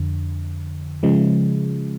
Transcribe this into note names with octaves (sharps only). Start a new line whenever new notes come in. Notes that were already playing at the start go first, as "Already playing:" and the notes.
Already playing: F2 D3
C#3 F3 G#3